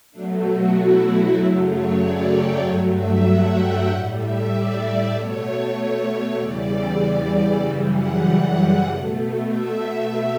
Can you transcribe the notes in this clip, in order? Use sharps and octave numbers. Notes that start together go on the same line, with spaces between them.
B2 F#3 A3 D4
F#4
E4
F#2 C#3 F#3 A3 E4
C#5
D5
G5
G2 F#3 A3 C#5
E5
F#5
G5
A2 G3 F#5
E5
D5
B2 A3 C#5
E2 C#3 E3 G3 D5
F#2 C#3 E3 G3 E5
F#5
F#5
B2 A3
E5